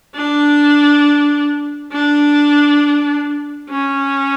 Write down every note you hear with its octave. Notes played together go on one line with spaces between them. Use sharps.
D4
D4
C#4